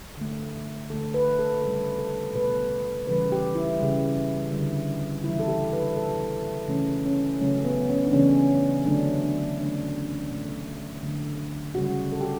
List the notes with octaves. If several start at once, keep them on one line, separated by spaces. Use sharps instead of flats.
D3 A3
D3 A3 A4
B4
A4
C#3 G3 A4
A4
B2 A3 B4
C#3 E3 G3 B4
G4
E4
C#3 G3
D3 G3
C#3 E3 G3 E4
A4
G4
B4
B2 G3 A4
C#3 E3 A3 C#4
C#4
C#3 F#3 A3 C#4
B3
C#4
D4
C#3 E3 A3 C#4
D3 F#3 A3 D4
D4
D3 A3 D4
B2 A3
D3 F#3 A3
C#3 G3 F#4
A4
G4